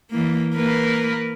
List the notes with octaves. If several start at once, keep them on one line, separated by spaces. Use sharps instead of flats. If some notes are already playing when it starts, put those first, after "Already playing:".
E3 A#3
A#3 A#4 B4